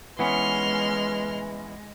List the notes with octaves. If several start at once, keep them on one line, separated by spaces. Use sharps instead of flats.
E3 G#3 B3 C#4 B4 C6 F6